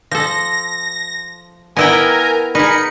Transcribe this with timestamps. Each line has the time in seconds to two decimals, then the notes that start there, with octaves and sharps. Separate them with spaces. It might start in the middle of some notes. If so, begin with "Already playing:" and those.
0.11 F3 A4 A#6
1.77 B3 E4 A#4 G5 G#5
2.55 D#4 G#4 A#4 B5 C#7